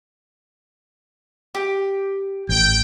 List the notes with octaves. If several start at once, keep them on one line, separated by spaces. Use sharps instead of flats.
G4
A1 G5